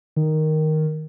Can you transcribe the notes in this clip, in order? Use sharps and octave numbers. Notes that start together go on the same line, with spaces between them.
D#3